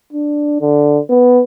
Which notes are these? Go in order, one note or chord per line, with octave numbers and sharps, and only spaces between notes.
D4
D3
B3